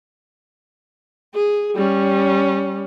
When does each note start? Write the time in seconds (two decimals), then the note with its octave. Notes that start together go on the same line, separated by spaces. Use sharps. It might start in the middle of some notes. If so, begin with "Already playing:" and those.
1.34 G#4
1.75 G3 C#4